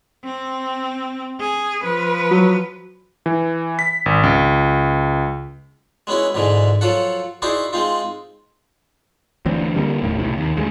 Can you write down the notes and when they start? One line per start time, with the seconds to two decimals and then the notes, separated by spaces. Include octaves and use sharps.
0.24 C4
1.40 G#4
1.83 F3 B4
2.31 F#3
3.26 E3
3.79 B6
4.06 G#1
4.23 C#2
6.07 G#3 B3 C#4 E4 F#4
6.34 G#2 B2 D3 E3 G#3
6.81 F3 F#3 F4 A4 F#5
7.42 D#4 E4 F#4 G#4 C5 D5
7.73 G#3 C4 D#4 F4
9.46 D2 E3 C4 D4
9.75 D3 G3 A3 A#3
10.02 F1 D#2 A2 D#3
10.19 C2 A2 C3
10.38 D#2
10.57 D2 G#3